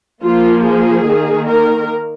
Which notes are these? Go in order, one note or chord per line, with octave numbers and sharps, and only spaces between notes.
F3 A#3 F4
G#4
D#3 A#3
A#4